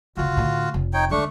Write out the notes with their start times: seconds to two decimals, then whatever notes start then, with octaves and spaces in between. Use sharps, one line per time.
0.17 F#1 D2 F4 F#4
0.37 A2 D3
0.74 F1
0.93 D#4 C#5 G5
1.11 D2 G#3 A3 D4 C#6